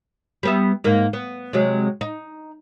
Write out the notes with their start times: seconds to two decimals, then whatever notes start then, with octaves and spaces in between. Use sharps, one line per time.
0.43 G3 B3 E5
0.84 G#2 A#3
1.13 B3
1.53 C3 F#3 G#3
2.01 D#4